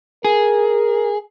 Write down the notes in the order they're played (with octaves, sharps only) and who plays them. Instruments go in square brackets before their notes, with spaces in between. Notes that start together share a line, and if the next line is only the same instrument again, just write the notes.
[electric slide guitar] G#4 [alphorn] A#4